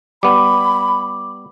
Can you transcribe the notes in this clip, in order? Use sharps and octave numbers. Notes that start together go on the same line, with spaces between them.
G3 B3 B5 D6